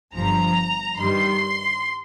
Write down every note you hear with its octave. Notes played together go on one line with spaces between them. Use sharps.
G1 G2 F3 A#5
G2 D#3 G3 C6